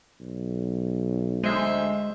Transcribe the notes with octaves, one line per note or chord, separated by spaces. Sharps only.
B1
D2 G#3 C5 E5